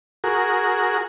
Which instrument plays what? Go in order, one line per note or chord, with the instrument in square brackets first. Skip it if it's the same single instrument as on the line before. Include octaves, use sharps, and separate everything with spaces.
[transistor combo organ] F#4 G#4 A#4